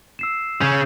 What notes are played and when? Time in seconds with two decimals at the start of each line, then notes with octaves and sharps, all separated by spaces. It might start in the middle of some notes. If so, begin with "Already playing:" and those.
0.19 E6 C7 E7
0.61 C#3 C#4 G6